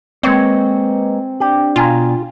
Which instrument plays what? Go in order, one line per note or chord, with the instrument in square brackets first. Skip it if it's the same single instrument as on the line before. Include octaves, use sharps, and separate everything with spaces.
[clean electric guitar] G#3 A#3 C#5 [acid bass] C4 [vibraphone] B4 D#5
[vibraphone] D4 D5 G5 [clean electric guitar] G4
[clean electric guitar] B2 G#5 A#5 [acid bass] F4